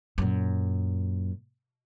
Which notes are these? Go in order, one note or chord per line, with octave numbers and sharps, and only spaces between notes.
F#2 A#2